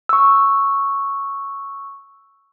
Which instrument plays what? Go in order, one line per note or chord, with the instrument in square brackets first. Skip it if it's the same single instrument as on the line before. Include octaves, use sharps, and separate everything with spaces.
[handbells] C#6 E6